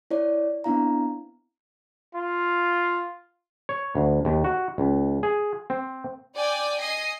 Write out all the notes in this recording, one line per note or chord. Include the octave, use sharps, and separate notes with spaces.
E4 C#5 D5
B3 C4 D4 E4 F5 A#5
F4
C#5
D2
D#2
F#4
C#2
G#4
C4
D5 G5 G#5
D#5 G#5 C7